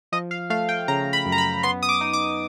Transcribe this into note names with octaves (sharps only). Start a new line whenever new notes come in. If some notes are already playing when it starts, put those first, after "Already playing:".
F3 D#5
F5
A3 F5
G5
C#3 A#5
B5
F#2
A#5
B5
B3 C6
D#6
D6
D#4
D6